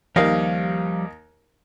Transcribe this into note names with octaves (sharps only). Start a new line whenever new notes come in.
D#2 F3 G3 D#4 A#4 F5